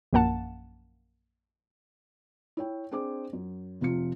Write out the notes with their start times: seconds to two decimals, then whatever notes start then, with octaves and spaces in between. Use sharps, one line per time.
0.13 A#1 F#2 A#3 F#5 A5
2.57 E4 C#5 G5
2.91 C4 D4 G#4 C5 D6
3.33 F#2
3.81 F1 C3 F3 F4 C#7